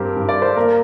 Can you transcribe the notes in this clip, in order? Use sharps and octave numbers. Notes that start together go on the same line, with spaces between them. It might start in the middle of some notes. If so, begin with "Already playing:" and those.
Already playing: G2 C4 F4 G4 A#4 C5
G2
D5
C5
A#3 A#4